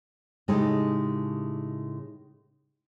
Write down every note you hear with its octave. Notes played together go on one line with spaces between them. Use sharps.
A2 C#3 G#3 D#4 G4 A4